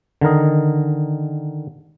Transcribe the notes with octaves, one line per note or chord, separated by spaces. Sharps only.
D3 D#3 A#4 D#5